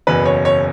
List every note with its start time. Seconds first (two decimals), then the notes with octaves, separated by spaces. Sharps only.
0.07 F#1 E2 B2 B3 B4
0.26 C#5
0.45 C#5